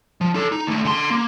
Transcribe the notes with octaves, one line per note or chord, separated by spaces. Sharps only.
F3
D#4 A4
D#4
D#2 A3
D3 C6
A#3